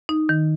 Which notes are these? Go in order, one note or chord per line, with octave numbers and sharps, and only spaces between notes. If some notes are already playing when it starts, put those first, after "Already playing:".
D#4
D#3